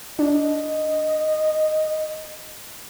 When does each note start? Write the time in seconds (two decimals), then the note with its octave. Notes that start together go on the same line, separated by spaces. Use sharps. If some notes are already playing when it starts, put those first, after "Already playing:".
0.19 D4 D#5